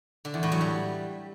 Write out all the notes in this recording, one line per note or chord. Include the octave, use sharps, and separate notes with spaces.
D3
E2
A2
F#3
G3